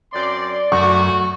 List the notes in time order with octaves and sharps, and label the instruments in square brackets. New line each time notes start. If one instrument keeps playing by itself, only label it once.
[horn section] F#2 C4 C6 [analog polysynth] D5
[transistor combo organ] F#2 [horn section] A3 F#4 [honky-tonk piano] C#6